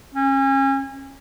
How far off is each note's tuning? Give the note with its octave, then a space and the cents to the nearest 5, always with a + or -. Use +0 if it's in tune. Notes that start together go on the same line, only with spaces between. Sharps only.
C#4 -30